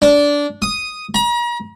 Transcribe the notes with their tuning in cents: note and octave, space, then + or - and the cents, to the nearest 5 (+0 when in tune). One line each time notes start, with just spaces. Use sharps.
D4 -15
D#6 +0
A#5 +40